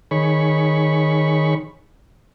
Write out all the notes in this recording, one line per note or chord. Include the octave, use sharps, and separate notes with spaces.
D#3 G#4 C#5 B5 C#6